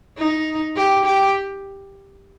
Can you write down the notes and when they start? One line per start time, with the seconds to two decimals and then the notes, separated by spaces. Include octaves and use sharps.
0.18 D#4
0.77 G4
1.06 G4